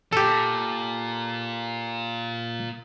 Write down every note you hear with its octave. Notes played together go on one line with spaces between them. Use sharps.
A#2 G4 A4